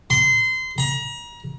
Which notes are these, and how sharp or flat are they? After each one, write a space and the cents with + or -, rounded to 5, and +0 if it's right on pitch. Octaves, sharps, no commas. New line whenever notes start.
C6 -25
A#5 +35